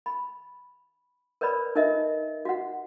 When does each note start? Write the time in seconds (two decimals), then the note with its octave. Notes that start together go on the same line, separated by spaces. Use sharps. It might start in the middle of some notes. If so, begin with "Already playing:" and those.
0.06 B5
1.41 A#4 B4 C#5 D5 B5
1.75 D#4 A4 A#4 D#5 E5
2.45 F#4 F#5